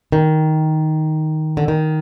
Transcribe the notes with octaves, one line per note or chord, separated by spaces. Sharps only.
D#3
D3
D#3